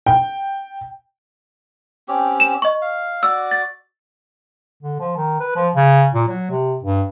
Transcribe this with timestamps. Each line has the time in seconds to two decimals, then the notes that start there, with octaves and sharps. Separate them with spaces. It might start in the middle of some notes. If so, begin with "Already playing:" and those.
0.06 G5
2.08 C4 C#4 G4
2.40 E7
2.62 D#5 C#6
2.82 F5
3.23 F#4 D5 E6
3.51 A6
4.83 D3
5.00 F3
5.17 D#3
5.40 B4
5.56 F3
5.76 C#3
6.14 A#2
6.28 F#3
6.51 C3
6.83 G2